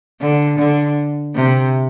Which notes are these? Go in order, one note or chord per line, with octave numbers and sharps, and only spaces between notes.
D3
D3
C3